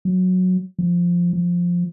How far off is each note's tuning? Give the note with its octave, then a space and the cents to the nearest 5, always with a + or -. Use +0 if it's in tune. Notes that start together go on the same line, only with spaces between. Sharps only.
F#3 -10
F3 +0
F3 +5